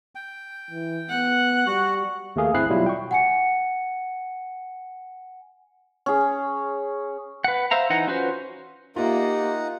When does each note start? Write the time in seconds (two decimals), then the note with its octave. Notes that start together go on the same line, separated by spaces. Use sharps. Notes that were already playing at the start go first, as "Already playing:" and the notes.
0.15 G5
0.71 E3
1.10 B3 F#5
1.67 G3 F#4
2.36 D#2 A3 A#3 G#4 F5
2.54 G1 C4 E4 G#4 F#6 C7
2.69 B2 F#3 G3 E4 F4
2.86 G5 C#6
3.11 F#5 G#5 C#7
6.06 C#4 G#4
7.44 B4 F#5
7.71 C5 E5 F5 A#5
7.90 E3 D#4 F#5
8.07 C#4 F4 F#4 B4 C5
8.96 A#3 D#4 F4 G4 E5 F#5 A#5